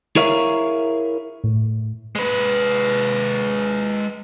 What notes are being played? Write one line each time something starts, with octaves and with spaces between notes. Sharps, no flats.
E4 G#4 A#4 C#5 E5 F5
A2
G#3 B4